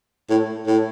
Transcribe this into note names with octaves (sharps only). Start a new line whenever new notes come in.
A2
A2